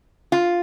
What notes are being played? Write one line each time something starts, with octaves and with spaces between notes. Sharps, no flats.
F4